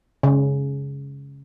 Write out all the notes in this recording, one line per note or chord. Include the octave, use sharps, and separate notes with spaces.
C#3